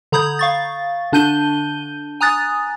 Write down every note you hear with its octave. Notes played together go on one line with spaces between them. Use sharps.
D3 A#5 B5 D#6 G6 G#6
F5 C#6 A6
D3 D4 A5 G6 D#7 G7
G#5 A#5 D#6 F#6 A6